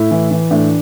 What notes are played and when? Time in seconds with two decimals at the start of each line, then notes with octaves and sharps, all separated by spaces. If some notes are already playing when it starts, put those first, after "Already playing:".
Already playing: A2 E4
0.11 E3
0.31 E3
0.50 A2 D4